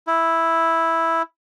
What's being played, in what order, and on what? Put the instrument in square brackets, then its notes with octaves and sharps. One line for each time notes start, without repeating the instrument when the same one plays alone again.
[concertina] E4